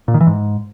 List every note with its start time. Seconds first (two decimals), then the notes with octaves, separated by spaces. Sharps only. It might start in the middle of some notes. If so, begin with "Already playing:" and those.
0.08 A#2
0.14 D#3
0.21 E3
0.27 G#2